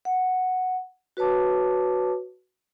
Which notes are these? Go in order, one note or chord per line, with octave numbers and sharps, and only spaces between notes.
F#5
F#4 B4 C#5 A5 D6